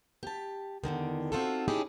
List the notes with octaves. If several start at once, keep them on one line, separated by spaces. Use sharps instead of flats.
G4 A5
E2 G#2 D3 D#3
C4 D#4 F4 F#4 A4
C#4 D#4 E4 G4 G#4 A5